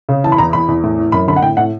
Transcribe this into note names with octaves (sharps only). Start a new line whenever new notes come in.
C#3
E3 A5
B5
E2 A#5
E2 B5
E2
A2
E3
F#2 B5
D3 B5
F#5
A2 G5
A2 F#5